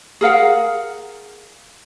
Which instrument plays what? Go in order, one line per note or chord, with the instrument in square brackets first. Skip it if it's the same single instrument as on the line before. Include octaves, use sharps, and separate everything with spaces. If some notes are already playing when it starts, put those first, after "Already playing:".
[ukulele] G#4 A#4 F5 F#5